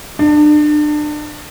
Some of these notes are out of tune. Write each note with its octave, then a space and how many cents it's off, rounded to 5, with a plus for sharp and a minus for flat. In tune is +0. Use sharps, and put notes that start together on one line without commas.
D4 +30